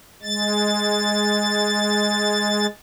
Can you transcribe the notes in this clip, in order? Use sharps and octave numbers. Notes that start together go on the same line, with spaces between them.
G#3 A6